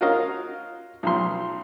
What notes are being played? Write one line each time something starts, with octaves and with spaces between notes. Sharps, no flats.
F4 F#4 A#4 C#5 D#5 F5
B1 F3 C6